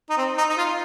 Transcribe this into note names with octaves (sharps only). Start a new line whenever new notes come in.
D#4
C4
D#4
D#4
F4